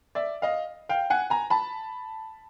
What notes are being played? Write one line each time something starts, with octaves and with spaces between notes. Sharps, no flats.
D5 E5
D#5 F5
F5 G5
F#5 G#5
G#5 A#5
A5 B5